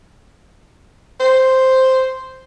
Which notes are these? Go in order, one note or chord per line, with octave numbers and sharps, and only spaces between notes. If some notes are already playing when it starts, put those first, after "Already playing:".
C5